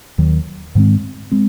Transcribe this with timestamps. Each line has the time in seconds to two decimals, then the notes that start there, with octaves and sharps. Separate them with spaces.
0.18 D#2 D#3 F#3
0.75 G#2 D#3 G#3 C4
1.32 G#3 C4